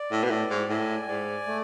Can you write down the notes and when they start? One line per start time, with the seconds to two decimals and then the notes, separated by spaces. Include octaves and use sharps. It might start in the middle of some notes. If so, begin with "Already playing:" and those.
Already playing: D5
0.12 A2
0.24 B2
0.31 A2 D5
0.50 G#2
0.69 A2 G#5
1.08 G#2 D5
1.47 A3